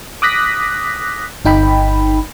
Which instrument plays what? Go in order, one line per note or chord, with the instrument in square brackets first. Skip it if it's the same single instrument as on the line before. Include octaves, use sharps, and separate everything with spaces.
[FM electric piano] D6 D#6 F#6 A#6 B6
G1 D#4 G5 B5